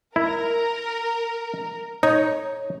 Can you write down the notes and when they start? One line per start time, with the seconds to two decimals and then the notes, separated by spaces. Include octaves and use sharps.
0.16 E4 A#4
2.03 D#4 C#5